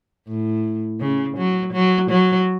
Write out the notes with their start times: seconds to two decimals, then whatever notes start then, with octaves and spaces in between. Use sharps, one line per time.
0.27 A2
1.00 C#3
1.37 F#3
1.73 F#3
2.10 F#3